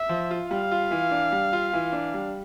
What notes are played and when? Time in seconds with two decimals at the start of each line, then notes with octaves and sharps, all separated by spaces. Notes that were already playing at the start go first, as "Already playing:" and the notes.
Already playing: E5
0.09 F3
0.31 F4
0.51 G3 F5
0.71 F4
0.91 E3
1.11 D4
1.32 G3
1.53 F4
1.73 E3
1.93 D4
2.14 G3